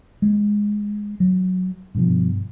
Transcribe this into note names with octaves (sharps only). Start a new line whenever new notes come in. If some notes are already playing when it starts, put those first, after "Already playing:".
G#3
F#3
G2 B2 F3